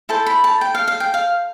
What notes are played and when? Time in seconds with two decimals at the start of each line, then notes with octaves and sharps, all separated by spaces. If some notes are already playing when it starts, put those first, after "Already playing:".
0.09 E4 A4 C5 A5
0.27 B5
0.44 A5
0.61 G5
0.75 F5
0.88 F5
1.00 G5
1.14 F5